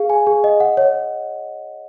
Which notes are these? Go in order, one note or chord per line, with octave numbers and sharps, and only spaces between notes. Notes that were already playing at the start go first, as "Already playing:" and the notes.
Already playing: G#4 F5
G#5
G#4
D#5
F#5
C#5